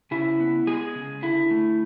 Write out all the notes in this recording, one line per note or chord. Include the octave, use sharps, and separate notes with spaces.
C#3 E4
B3
G#3 G#4
C#3
D3 E4
A3